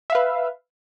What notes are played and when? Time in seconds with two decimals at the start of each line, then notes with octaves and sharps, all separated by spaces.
0.10 E5
0.12 F5
0.15 B4